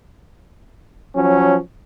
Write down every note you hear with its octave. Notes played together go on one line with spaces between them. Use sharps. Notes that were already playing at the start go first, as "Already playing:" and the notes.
F3 F#3 C#4